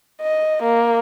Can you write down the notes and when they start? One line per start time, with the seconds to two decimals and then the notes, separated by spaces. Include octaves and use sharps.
0.22 D#5
0.63 A#3